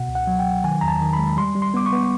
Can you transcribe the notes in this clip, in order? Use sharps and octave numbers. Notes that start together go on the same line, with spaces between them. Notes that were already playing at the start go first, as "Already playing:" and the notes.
Already playing: B2 F#5
C#2
F#5
F#3
G5
F#3
D#3 G#5
E2 A#5
A5
D#3
B5
G#3
G3 C6
G3
C6
B3 D6
C#6
B3